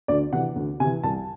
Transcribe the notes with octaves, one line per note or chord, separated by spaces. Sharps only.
D2 D5
C3 E3 F#5
D2
C3 E3 G#5
C2 A5